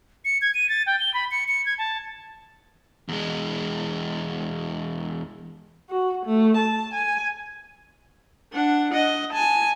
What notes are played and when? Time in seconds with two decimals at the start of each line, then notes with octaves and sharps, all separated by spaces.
0.25 C#7
0.42 G#6
0.54 D#7
0.69 A6
0.87 G5
1.00 G7
1.14 B5
1.31 C#7
1.48 C#7
1.66 G#6
1.78 A5
3.09 E2 G#3
5.90 F#4
6.26 A3
6.57 A5
6.94 G#5
8.53 D4 F#5
8.91 D#5 F#5
9.32 G#5 A5